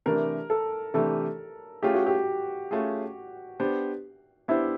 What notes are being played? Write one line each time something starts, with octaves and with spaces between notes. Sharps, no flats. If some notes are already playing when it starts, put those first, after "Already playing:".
C3 E3 A3 D4 G4 A#4
A4
C3 E3 A3 D4 G4 A4
A3 C#4 F4 G4 G#4
F#4
G4
A3 C#4 F4 G#4
B3 D4 G4 C5
B3 D4 E4 G4 C5